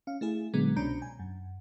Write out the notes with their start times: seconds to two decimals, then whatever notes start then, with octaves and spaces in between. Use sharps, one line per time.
0.07 C#4 F5
0.21 A3 E4 G#4
0.54 A#2 D3 F#3 G#3 B3
0.76 C2 B2 C#4 D4 A#5 G6
1.02 G#5
1.19 F#2